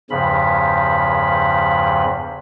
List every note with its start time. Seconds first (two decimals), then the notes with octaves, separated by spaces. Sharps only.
0.10 E2 G2 C#3 F3 B5